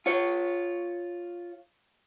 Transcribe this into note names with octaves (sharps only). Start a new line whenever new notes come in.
F4 C#5